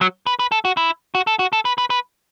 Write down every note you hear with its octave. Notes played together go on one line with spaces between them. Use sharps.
F#3
B4
B4
A4
F#4
E4
F#4
A4
F#4
A4
B4
B4
B4